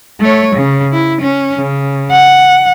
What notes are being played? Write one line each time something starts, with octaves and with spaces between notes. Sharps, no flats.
A3 C#5
C#3
E4
C#4
C#3
F#5